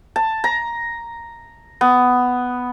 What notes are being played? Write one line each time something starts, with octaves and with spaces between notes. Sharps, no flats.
A5
A#5
B3